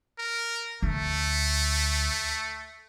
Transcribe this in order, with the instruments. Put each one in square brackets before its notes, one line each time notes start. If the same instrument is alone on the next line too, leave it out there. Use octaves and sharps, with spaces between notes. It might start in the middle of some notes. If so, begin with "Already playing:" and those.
[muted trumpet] A#4
[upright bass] D2 [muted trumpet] A3